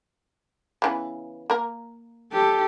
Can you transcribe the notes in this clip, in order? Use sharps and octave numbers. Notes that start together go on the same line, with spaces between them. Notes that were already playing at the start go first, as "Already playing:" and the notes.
C#3 E3 B3
A#3 A#4
G4 A4